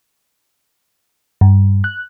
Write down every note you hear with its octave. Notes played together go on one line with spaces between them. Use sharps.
G2
F#6